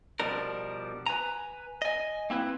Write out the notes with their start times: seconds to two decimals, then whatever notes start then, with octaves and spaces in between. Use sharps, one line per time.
0.20 B2 F3 G3 D4 A#4
1.06 B4 G#5 A#5
1.82 D#5 G#5
2.30 A#3 C4 E4 B4